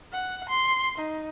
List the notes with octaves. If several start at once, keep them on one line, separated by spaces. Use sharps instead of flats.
F#5
C6
D#4